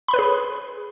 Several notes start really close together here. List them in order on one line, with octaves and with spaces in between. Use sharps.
B5 C6 B4 C#5 G#4